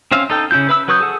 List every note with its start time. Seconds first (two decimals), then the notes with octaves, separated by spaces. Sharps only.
0.12 C4 C#4 C5 E5 F5
0.30 D#4 A4 G5
0.51 C#3 C#4 E4 F4 G6
0.69 B4 E5 B5 E6
0.88 F#3 B4 C#6 D#6 G6
1.00 G#4 A4 F#5